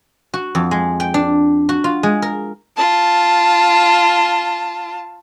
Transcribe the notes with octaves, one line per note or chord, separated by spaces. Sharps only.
F#4
F2
G#3
G5
D4
F#4
F4
G#3
A#4
F4 A5